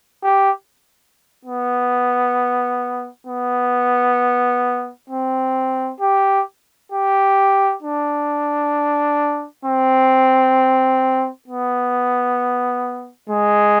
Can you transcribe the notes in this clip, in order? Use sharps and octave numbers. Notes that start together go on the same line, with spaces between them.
G4
B3
B3
C4
G4
G4
D4
C4
B3
G#3